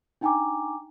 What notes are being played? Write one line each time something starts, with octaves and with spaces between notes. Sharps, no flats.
D4 D#4 G5 G#5 A#5 D6